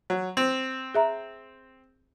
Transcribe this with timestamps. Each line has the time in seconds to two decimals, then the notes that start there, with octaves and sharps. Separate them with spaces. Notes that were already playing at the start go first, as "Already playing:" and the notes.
0.10 F#3
0.37 C4
0.95 G#4 E5 A#5